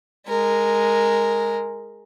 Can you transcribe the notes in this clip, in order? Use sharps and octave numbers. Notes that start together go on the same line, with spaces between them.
G#3 A#4